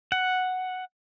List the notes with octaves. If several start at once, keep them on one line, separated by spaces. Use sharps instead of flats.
F#5